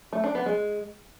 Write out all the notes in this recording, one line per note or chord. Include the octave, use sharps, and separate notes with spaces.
A3
D4
B3
G#3